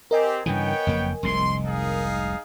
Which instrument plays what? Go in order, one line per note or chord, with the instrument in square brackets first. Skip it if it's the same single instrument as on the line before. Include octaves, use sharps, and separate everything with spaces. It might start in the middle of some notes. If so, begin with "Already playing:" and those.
[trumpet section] C4 G4 [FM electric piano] A#4 D#5 G#5
[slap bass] G2 C#3 E3 [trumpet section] B3 C#5 G5
[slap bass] F#1 F2 A#3
[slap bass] F1 C2 G#2 [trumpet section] C6
[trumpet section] D#4 G#4 F5